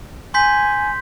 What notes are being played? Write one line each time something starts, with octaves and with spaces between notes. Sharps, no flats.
G#5 C6 G6 B6